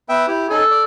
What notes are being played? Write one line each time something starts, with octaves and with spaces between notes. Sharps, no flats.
B3 E5 G5
E4 G4
C#4 D#4 A4 G#5
D5